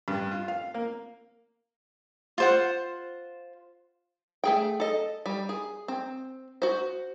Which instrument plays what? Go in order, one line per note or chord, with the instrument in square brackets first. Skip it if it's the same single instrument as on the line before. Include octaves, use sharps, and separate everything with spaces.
[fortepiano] G2
F4
F5
A#3
[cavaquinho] F4 C5 F#5
[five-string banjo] A3 G#4 G5
A4 D#5
G3
G#4
C4
F#4 C5